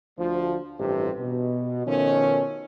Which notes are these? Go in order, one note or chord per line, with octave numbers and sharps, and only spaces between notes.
D2 F3
A1 G2 C3 F3 G4
B2
B2 D#3 F3 A3 C#4